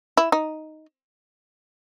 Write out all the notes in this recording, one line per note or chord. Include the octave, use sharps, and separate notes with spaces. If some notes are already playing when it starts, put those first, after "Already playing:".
E4
D#4